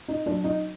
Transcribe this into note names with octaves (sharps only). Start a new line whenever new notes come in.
D#4
F#3 D4
D#4